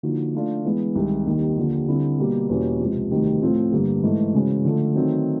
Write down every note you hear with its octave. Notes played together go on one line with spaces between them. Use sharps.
D3 F3 A#3 D#4 F#4
F3 A3 D4 F4
E3 G#3 B3
C2 C3 D#3 G#3 C4
D#2 D#3 G3
D#2 D3 F3 A#3
D3 G3 C4 E4
B2 G3 A#3
E2 B2 G3 A#3 C#4
C#2 C3 F3
D2 C3 D#3 G3
A2 F3 A3 C4 F4
G2 D3 G3 A#3
G#2 E3 A3
C#3 E3 G#3 C#4 F#4
D3 F3 A3
D#3 F#3 A3 C4